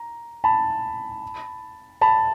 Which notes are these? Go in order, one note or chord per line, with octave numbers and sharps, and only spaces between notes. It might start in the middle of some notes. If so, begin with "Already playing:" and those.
Already playing: A#5
A5 B5
A5 B5